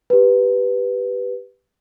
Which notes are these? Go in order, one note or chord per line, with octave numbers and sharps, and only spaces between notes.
G4 B4